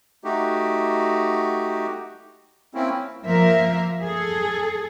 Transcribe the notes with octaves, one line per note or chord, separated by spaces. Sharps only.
A3 D#4 F#4 G4
A#3 C4 C#4 E4
F3 A#3 A#4 E5
G#4 A4